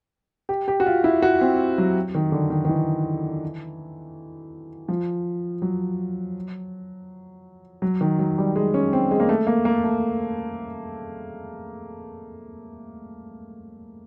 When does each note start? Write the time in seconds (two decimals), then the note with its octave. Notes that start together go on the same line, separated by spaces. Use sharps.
0.49 G4
0.68 G4
0.80 F#4
0.86 F4
1.04 E4
1.22 F#4
1.41 C4
1.78 F#3
2.15 D#3
2.32 D3
2.50 D#3
2.65 D#3
2.69 E3
4.88 F3
5.62 F#3
7.82 F#3
8.01 D#3
8.19 F#3
8.38 G3
8.56 G#3
8.74 C#4
8.93 C4
9.11 G#3
9.20 A#3
9.29 A3
9.47 A#3
9.65 A#3
9.84 A3